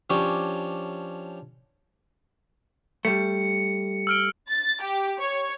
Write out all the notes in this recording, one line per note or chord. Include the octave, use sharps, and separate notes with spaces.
F3 C#4 D4 G4 C#5
G3 A3 C#7
E6 F6 D7
A6
G4
C#5